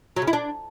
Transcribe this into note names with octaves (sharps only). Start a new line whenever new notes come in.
F#3
C#3
E4
D4